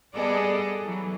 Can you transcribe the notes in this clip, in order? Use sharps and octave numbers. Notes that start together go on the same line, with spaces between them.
G3 B3 G#4 A4 D5 D#5
E3 F#3